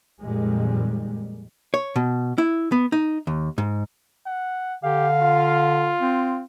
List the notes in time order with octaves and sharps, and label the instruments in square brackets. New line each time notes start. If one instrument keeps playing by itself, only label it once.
[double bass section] F2 A#2 D#3 G3 G#3
[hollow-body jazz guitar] C#5
B2
E4
B3
D#4
D#2
G#2
[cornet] F#5
[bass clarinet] D3 [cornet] G4 [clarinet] F5
[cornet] F4
[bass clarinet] C4